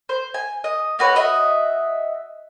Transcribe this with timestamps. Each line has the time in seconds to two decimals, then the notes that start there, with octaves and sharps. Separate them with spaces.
0.09 C5
0.34 G#5
0.64 D#5
0.99 A#3 F#4 B4 C#5
1.15 F#4 D#5 E5